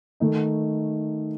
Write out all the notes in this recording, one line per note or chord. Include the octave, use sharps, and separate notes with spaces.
D#3 A3 D#4